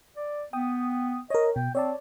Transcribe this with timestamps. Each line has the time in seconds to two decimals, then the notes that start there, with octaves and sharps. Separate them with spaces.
0.16 D5
0.53 B3 G5 D#6
1.30 A#4 C#5 D#5
1.56 B2 G5
1.75 C4 C#5 D5 A5